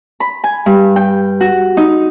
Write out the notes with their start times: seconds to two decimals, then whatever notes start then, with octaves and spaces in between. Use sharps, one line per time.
0.20 B5
0.44 G#5
0.66 G2
0.96 G5
1.40 F#4
1.77 D#4